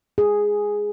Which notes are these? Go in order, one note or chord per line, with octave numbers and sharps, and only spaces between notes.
G#4